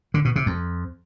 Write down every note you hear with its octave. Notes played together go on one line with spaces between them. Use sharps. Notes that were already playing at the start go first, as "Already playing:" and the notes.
D3
B2
C3
F2